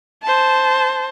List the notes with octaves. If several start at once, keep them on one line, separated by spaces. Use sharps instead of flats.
C5 A5